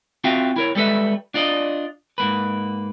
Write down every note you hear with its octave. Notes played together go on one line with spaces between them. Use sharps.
C4 F4 F#4 E5 F5 G5
E4 A#4 C#5
G3 G#3 A4 B4 E5
D4 F4 D5 D#5
G#2 A#3 B4